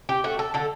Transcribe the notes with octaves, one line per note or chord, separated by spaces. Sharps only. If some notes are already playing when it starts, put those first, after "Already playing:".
G4
A3 F#4
A4
D3 A4